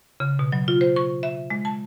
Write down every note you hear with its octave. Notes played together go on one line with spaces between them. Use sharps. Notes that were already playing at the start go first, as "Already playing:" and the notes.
C#3
B2
F#3
F4
C5
C#6
E5
G#3
A5